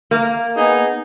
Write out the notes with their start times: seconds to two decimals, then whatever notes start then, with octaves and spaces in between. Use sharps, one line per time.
0.11 A#3
0.56 B3 D#4 G#4